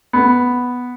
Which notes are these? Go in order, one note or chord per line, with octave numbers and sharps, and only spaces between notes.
B3